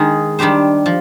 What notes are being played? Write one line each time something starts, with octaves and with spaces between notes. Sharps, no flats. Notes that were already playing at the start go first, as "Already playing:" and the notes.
Already playing: D#3 G#3 D#4 G#4
D#3 G3 D4 G4 C5
F3